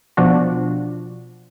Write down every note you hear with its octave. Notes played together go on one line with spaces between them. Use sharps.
B2 F3 D4 F#4